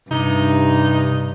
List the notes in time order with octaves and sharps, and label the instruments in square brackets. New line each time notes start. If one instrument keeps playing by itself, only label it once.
[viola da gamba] G2 [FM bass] C3 [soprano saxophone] D#4